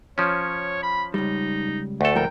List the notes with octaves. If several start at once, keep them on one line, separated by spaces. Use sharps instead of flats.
F3 C#4 C#5
B5
C#2 G3 D#4
D2 A3 A4
F2 A2 A#4 G5